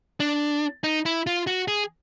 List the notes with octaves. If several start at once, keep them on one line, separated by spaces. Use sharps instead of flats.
D4
D#4
E4
F4
F#4
G#4